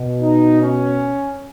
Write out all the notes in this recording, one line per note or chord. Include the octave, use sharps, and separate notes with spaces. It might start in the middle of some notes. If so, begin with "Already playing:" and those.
Already playing: B2
D#4
C#4